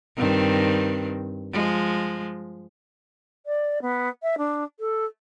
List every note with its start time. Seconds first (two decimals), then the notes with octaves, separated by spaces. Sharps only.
0.17 G2 D#3 C4
1.53 F3 G#3
3.46 D5
3.81 B3
4.22 E5
4.38 D4
4.79 A4